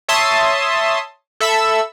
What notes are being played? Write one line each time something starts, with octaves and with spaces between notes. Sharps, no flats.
C#5 E5 A5 C6 D#6
A4 E5 B5 E6